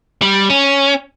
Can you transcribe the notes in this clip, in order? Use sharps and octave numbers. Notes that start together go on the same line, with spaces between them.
G3
C#4